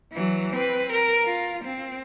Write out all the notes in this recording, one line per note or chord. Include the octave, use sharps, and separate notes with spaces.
E3 F#3
C4 B4
A#4
F4
C4